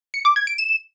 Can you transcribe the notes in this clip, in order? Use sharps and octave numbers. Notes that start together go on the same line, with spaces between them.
C#7
D6
G#6
D7
E7